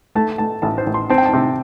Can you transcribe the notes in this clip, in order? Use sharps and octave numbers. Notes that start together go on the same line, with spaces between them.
A3 A5
A3 A5
A1 A5
C5
A1
C6
C4 A5
G5
A5
C3